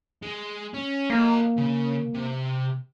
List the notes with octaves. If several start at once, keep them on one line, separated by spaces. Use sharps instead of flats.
G#3
C#4
A#3 A4 D#5
C#3
C3